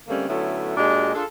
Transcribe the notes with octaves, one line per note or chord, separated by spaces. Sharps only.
D3 G3 A3 A#3 C4 C#4
D3 F#3 A3 B3 C#4 E4
A#2 G#3 D4 F#4 G4 D#5
D4 F4 G#4 A4